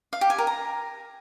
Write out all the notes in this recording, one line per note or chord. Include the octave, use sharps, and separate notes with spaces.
F5
G4
G#5
A#4
A#5